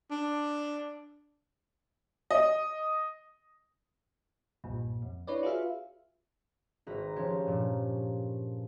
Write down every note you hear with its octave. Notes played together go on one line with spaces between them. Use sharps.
D4
D#5
B1 G2 A#2
F2
D4 E4 B4 C#5 D5
F4 F#4 G#4 B4 E5 F5
G#1 F#4 B4 A#5 A#6
F3 C#4 G4 C#5
G2 A#2 F3